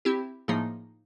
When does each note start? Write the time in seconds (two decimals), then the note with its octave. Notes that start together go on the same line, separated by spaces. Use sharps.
0.05 C4 E4 G4
0.48 A2 F3 A#3 D#4 G#4